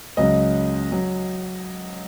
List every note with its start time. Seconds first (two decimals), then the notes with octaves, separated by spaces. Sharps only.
0.17 C#2 C#3 F#3 D#5
0.92 F#3